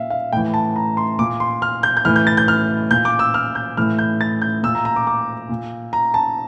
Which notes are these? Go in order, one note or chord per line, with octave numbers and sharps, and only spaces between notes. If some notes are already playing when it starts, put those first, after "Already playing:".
Already playing: A#2 E5 F5
F5
A2 E3 G5
A5
A#5
C6
A#2 D6
C6
F6
G6
G6
A2 E3 F6
G6
A6
G6
F6
A#2 G6
D6
E6
F6
G6
A2 E3 F6
G6
A6
G6
A#2 E6
A#5
A#5
D6
D6
A#2
A#5
A5